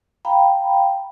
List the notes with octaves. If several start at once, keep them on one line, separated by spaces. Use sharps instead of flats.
F5 G5 A#5 B5